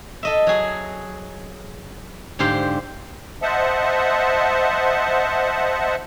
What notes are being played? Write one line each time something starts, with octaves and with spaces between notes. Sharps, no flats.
A4 D#5 E5
F#3 F#4 G#4
G#2 D3 G4 C5 F5 G5
C5 D#5 E5 F#5 A5